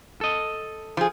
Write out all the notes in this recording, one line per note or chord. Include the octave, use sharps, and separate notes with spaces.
A4 D#5
F3 G#4